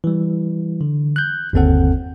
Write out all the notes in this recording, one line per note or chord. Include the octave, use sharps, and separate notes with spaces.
E3 G3
D3
F#6 G6
G1 D#2 C4 A4 F#5